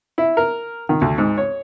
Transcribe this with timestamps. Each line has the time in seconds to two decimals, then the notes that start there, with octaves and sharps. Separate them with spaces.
0.18 E4
0.37 A#4
0.89 D#3
1.01 D2
1.18 G#2
1.37 C#5